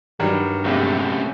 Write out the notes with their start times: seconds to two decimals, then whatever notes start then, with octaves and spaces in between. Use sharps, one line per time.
0.20 G2 D#3 F#3 G3
0.64 A#1 F#2 C3 G#3 A3